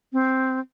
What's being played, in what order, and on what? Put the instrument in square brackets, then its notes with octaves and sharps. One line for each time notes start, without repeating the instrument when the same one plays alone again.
[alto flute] C4